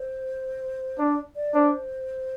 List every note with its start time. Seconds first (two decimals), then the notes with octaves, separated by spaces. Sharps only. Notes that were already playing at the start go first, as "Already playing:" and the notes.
Already playing: C5
0.99 D4 D5
1.36 D5
1.54 D4 C5